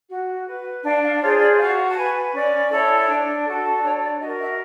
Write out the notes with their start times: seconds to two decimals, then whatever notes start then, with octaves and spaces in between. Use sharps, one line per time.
0.09 F#4
0.47 B4
0.84 D4 F5
1.03 F5
1.21 F4 G#4 C5 C#5
1.40 D5
1.58 F#4 F5
1.89 A5
1.97 B4 G#5
2.34 C#4 D5
2.71 E4 A4 C#5
3.08 D4
3.45 F#4 A4
3.76 D5
3.83 D4 C#5
4.01 D5
4.20 F#4 A#4 D#5
4.39 E5